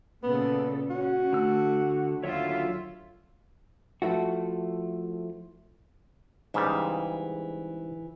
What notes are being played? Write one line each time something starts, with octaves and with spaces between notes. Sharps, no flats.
A#2 C#3 B3 A4
C#4 F#4
D3 A3 E6
D#2 D3 F#3 F4 C#5 E5
F3 A3 E4 F#4
G#2 C#3 E3 G3